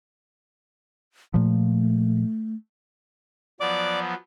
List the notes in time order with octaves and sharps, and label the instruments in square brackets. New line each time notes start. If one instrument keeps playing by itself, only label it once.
[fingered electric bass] A#2 F3 [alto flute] A3
[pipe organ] F3 F#3 B3 [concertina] D5 D6